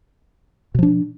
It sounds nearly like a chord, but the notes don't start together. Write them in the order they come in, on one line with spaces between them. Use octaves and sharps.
B2 F3 D4